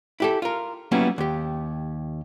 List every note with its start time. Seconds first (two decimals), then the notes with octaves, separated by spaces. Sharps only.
0.20 E4 G4 A4
0.42 F4 A#4
0.91 F#3 G3 A#3 B3 C#4 E4
1.18 D#2 G4